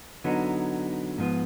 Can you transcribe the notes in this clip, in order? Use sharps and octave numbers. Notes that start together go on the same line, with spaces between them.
D3 F#3 B3 D#4
G#2 F3 B3